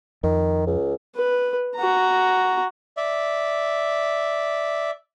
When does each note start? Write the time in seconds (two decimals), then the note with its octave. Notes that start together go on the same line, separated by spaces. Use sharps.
0.23 F2 D#3
0.67 C#2
1.16 B4
1.76 F#4 A#5
2.97 D5 E5